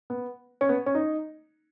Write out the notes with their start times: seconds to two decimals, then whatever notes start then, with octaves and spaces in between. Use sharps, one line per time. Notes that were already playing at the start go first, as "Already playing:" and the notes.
0.10 B3
0.61 C#4
0.69 B3
0.86 C#4
0.95 D#4